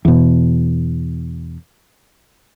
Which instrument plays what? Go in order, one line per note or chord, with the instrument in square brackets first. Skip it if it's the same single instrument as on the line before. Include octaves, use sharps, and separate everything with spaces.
[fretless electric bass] E2 B2